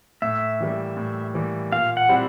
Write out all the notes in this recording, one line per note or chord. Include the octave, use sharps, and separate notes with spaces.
A2 E5
E3 G3 A#3
A2
E3 G3 A#3
A#2 F5
F#5
G3 C4 E4